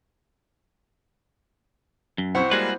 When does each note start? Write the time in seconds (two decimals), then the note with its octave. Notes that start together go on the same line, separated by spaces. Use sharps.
2.18 F#2
2.35 B1 C4 E4 C5 F#5 C#6
2.51 G3 G#3 A#3 F#4 G#4 B4